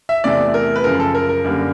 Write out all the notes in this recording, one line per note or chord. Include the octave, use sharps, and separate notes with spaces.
E5
E2 C3 E3 A3 D5
A#4
B4
F#2 C#3 F3 A#4
A4
A#4
A#4
F#2 D3 G3 A#3